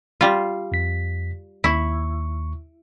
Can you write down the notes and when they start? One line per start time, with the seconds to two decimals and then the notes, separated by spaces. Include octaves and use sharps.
0.21 G3 F4
0.72 F2 B6
1.64 D#2 E4 C#6